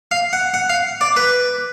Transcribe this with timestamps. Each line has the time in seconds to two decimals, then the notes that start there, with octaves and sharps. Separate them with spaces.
0.11 F5
0.33 F#5
0.54 F#5
0.69 F5
1.01 D5
1.16 B4